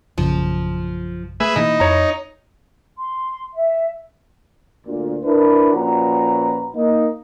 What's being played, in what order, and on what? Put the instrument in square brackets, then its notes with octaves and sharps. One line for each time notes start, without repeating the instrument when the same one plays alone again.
[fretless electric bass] A#1 F#2 C#3 [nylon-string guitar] F3
[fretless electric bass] A3 [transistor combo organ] G#4 B4 E5
[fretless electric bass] B2 E3 A#3 [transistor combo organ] D#4 [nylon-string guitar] E4
[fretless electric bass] F2 [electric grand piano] C#5 A#5
[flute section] C6
E5
[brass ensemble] D2 A#2
D4 E4 A#4 B4
A#2 F3 C#4 F#4 B4 A#5
A#3 D#4